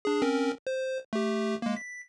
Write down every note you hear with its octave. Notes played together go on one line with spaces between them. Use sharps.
D4 G#4
C4 C#4 A#4
C5
A3 G4
G#3 A#3
B6